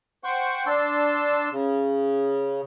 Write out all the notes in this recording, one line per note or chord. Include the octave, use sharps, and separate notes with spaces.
C5 F#5 G5 C#6
D4 A5 C6 E6
C#3